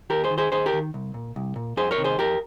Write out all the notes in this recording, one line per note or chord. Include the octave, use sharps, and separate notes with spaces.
D#2 G4 A#4
G#4 C5
D#3
G#4 C5
D#2 G#4 C5
G4 A#4
D#3
C2
A#2
C2
A#2
F2 G#4 C5
A#4 C#5
C3 D#3
G#4 C5
F2 G4 A#4